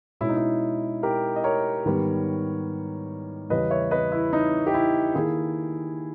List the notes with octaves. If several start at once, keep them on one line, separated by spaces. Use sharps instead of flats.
B2 G#3 C#4 E4
D#4
E4
G4 A#4
D#5
A#4 C#5
G#2 D#3 G3 B3
E2 C#3 G3 C#4 B4 D#5
C#5 E5
B4 D#5
E4
D#4
G4
E4
D#3 A#3 E4 G#4